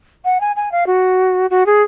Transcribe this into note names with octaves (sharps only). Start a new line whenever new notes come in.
F#5
G#5
G#5
F5
F#4
F#4
G#4